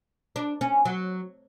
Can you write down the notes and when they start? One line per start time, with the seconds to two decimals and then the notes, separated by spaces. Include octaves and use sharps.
0.36 D4
0.61 C#4
0.85 F#3